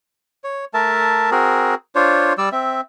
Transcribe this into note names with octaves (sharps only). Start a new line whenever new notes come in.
C#5
A3 A#4 E5 A5
C4 F#4 G#4 A#4
D4 F4 C5 C#5
G3 D5 E6
C4 E5